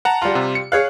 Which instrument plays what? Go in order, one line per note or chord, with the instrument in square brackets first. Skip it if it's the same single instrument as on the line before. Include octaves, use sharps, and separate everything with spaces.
[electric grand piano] F#5 A5 A#5
[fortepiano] G3 F4
[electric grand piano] C3
C#7
[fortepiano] G#4 C#5 F5 [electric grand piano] F#6